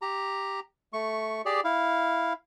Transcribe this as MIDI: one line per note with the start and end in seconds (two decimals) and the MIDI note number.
0.02 0.60 67
0.02 0.60 82
0.93 1.42 57
0.93 1.42 85
1.46 1.60 67
1.46 1.60 68
1.46 1.60 74
1.64 2.33 64
1.64 2.33 77